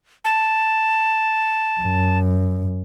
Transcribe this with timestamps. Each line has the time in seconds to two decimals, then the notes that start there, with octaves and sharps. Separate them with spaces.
0.25 A5
1.80 F#2